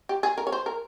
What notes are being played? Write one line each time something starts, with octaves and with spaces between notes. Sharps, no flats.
G4
G#4
A#4
C#5
C5
A#4